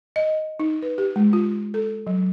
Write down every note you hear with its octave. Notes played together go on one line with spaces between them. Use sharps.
D#5
D#4
B4
G4
G#3
F4
A4
F#3